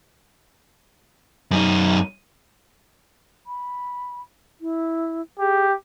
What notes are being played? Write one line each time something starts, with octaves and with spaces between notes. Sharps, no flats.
F#2 D#4
B5
E4
G4 G#4